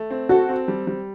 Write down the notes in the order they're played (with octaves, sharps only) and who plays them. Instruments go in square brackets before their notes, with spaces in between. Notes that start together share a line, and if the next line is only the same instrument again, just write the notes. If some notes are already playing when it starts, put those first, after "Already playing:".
Already playing: [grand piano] A3
C4
[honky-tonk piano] F#4 [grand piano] A4
[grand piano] C4
G3
G3